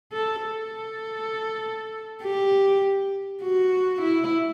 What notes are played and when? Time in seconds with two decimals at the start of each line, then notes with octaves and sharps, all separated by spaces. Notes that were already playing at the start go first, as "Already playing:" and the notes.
0.13 A4
0.43 A4
2.22 G4
3.42 F#4
4.02 E4